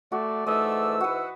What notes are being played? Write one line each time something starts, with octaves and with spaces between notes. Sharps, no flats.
A3 F#4 D5
G#2 E3 A3 D#5 E6
F#4 B4 F#5